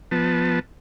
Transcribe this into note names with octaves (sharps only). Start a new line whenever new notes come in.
F3 B3 A5